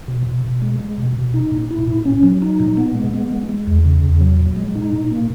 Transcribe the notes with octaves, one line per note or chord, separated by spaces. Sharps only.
B2
B2
B2
G#3
G#3
B2
B2
D#4
A#2
E4
A#2
C#4
F#3
D#4
A#2
B3
G#3
B3
G#3
G#3
E2
C#3
E2
F#3
A#2
G#3
D#4
A#2
A#3